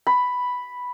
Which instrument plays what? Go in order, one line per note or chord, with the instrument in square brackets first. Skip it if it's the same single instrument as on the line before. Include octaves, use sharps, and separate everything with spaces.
[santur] B5